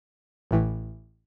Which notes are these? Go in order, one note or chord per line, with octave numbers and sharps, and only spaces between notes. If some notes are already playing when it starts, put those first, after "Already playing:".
A1 A2 E3